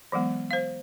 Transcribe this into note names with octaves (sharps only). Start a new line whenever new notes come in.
E3 F#3 G#3 B3
C5 F5